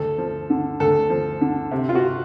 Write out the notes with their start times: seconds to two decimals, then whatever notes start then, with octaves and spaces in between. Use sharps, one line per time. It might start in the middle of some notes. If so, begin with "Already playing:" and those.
Already playing: D2 A4
0.18 F3
0.50 D3
0.80 D2 A4
1.10 F3
1.41 D3
1.71 C3
1.89 F4
1.95 F#4